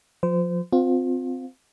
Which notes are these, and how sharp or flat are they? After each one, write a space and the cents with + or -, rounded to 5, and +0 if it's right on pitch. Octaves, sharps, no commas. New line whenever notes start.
F3 +25 C5 -30
C4 -15 F4 +25